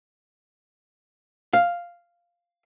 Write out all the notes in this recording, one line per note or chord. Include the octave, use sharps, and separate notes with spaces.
F5